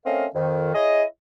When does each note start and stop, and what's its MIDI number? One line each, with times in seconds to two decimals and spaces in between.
0.06 0.26 57
0.06 0.26 60
0.06 0.26 61
0.06 0.26 70
0.06 0.26 75
0.06 0.26 77
0.35 0.71 41
0.35 0.71 51
0.75 1.04 64
0.75 1.04 68
0.75 1.04 73
0.75 1.04 75